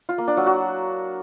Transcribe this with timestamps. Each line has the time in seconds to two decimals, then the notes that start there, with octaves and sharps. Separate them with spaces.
0.09 F4
0.18 A#3
0.28 D4
0.37 F#3
0.46 F#4